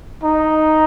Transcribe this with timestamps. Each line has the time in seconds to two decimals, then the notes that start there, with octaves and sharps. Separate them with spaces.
0.23 D#4